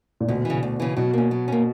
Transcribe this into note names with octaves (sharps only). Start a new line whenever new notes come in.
A#2
D2 B2
C#3 E3
D2
C#3 E3
B2 F#3
A#3 C#4
F#3
A#3 C#4